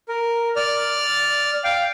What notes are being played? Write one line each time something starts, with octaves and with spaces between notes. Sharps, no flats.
A#4
D5 F6
F5 G5